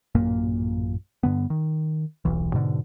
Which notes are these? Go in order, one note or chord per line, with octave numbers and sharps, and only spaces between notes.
A1 F#2 A#2 A#3
G2 D3 B3
D#3
D#1 B1 E3
G#2 B2 D3